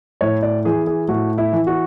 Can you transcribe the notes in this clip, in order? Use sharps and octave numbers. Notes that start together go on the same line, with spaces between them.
A2 C#5
D5
E3 G#4
G#4
A2 F#4
E4
E3
F#4